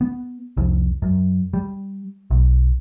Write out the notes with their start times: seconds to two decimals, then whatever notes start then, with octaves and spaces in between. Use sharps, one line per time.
0.01 B3
0.57 C2 F2
1.02 F#2
1.53 G3
2.31 B1